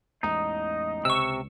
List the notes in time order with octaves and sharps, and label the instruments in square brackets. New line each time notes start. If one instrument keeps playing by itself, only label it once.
[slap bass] A1 E2 G#3 [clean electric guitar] D#4 [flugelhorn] D#5
[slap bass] C#2 [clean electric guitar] C3 [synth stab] C#6 E6